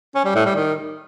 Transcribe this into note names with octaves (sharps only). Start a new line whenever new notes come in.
C#4
G3
A2
G3
D#3